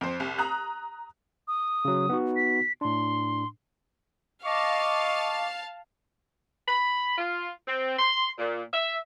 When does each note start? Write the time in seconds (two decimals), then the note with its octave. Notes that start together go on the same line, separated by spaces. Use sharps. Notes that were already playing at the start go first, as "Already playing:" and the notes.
0.01 F2 C5
0.20 C2
0.38 A#5 D#6 F#6
1.48 D#6
1.85 C#3 F#3
2.09 B3 D#4 F#4
2.36 B6
2.81 A2 D4 C6
4.44 D#5 F5 A5 C#6 D6
6.68 B5
7.18 F4
7.68 C4
7.99 C6
8.38 A#2
8.74 E5